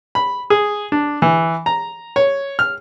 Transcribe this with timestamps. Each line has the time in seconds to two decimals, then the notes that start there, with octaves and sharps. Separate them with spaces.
0.15 B5
0.50 G#4
0.92 D4
1.22 E3
1.66 A#5
2.16 C#5
2.59 F6